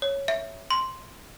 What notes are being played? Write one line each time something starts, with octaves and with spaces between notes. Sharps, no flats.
C#5
E5
C6